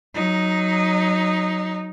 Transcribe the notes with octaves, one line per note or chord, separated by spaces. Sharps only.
F#3 D#4